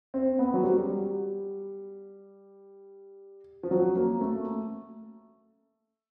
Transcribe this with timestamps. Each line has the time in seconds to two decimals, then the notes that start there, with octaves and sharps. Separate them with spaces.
0.14 C4
0.39 B3
0.54 F#3
0.64 G3
3.63 F3
3.71 F#3
3.96 A#3
4.21 A3